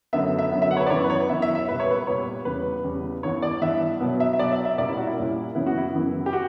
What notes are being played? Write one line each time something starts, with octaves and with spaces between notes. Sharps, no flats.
F#2 D3 F#3 B3 E5
E5
F#2 D3 F#3 B3
E5
F#5
C#5
B4
D5
F#2 E3 B3 C#5
B4
C#5
F#2 E3 B3 E5
E5
E5
A#2 G3 B3 B4
C#5
B4
A#2 G3 B3 C#5
E2 C#3 G3 B4
E2 C#3 G3
G2 E3 B3 C#5
D5
G2 E3 B3 E5
B2 F#3 B3
E5
E5
B2 F#3 B3 D5
E5
E5
A#2 G3 A#3 C#4 D5
E4
F#4
E4
A#2 G3 A#3 C#4
F#2 C#3 E3 B3 E4
F#4
E4
F#2 C#3 E3 B3
G4
F#4